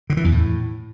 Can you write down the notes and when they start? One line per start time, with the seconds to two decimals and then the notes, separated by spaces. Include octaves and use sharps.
0.10 D3
0.17 E3
0.24 E2
0.32 A2